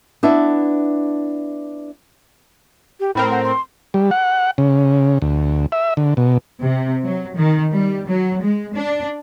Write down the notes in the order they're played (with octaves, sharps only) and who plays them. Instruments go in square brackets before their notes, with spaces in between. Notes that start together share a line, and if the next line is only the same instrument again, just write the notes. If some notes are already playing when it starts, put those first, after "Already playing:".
[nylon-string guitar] B3 D4 E4 E5
[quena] G4
[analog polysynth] A2 C4 A#4 [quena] B5
[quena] F#5
C6
[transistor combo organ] G3
F#5
C#3
D2
E5
D3
B2
[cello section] C3
F#3
D#3
G3
F#3
G#3
D4